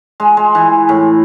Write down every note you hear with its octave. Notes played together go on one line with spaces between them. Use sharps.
G#3
G#3
E3
A2